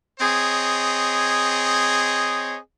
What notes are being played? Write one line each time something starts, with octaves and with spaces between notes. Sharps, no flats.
C4 G#4 C#5 D#5